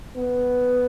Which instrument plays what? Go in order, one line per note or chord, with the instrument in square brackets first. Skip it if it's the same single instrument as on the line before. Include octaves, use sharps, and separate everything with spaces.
[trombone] B3